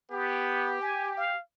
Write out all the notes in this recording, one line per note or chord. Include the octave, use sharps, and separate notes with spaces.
B3 G4
G#5
F5